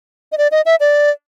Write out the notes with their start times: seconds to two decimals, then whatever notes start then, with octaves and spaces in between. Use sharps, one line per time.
0.32 D#5
0.38 D5
0.51 D#5
0.66 E5
0.80 D5